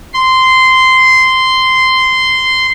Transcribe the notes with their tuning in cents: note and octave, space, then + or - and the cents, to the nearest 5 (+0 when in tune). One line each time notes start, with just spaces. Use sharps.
C6 -10